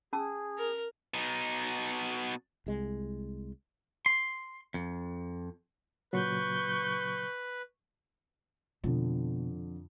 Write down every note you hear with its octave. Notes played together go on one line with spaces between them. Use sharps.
C#4 G#4 A5 E6
A#4
B2 D#4
C2 G#3
C6
F2
A#2 C#3 F#3 B4 C#6 G6
F2 B2 D3